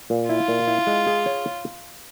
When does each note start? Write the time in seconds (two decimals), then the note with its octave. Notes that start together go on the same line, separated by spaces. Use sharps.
0.10 A#2
0.29 E4 F4
0.48 A#2
0.67 E4
0.87 G#3
1.07 G#4
1.26 C#5